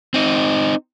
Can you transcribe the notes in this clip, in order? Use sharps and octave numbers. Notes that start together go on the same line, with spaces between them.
C4 D#4